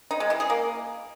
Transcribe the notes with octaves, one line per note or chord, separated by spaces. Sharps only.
D#4
G#3
E3
G#4
A#3